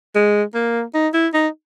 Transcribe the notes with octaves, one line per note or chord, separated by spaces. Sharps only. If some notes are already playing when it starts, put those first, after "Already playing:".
G#3
A#3
D#4
E4
D#4